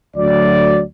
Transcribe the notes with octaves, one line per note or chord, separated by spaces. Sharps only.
D2 F#3 D5